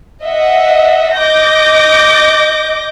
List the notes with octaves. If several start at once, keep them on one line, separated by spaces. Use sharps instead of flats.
D#5 E5 F#5
D#5 D6 G6 A#6